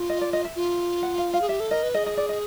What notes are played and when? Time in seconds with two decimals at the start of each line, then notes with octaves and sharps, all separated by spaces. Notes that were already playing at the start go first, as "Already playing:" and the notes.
Already playing: F4
0.09 D#5
0.21 D5
0.33 D#5
0.45 E5
0.56 F4
1.03 F#5
1.18 F5
1.34 F5
1.41 G#4
1.48 G4 E5
1.60 A4
1.71 A#4 D#5
1.83 B4
1.94 G#4 D#5
2.06 D#5
2.17 D5
2.29 D#5